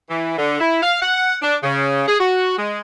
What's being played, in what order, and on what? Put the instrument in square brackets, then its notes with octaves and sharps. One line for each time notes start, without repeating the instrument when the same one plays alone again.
[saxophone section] E3
D3
E4
F5
F#5
D4
C#3
G#4
F#4
G#3